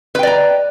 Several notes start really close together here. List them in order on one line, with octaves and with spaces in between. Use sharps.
B4 G5 D5 A#5